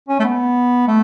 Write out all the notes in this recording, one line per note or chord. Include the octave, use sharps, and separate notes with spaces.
C#4
A3
B3
A3